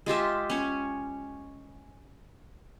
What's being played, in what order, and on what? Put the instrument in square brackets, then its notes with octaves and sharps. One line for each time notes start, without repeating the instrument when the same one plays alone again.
[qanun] G#3 F4 G4 E5
C#4 C#5